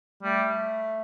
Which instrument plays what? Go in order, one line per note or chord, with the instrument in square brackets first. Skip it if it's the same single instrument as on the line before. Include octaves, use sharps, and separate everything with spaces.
[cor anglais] G3 [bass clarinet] A3